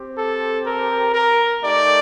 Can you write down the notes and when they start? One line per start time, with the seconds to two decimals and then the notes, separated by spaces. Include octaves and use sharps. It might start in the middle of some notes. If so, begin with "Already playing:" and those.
Already playing: C4 G4
0.16 A4
0.65 A#4
1.13 A#4
1.62 A3 D#4 G4 D5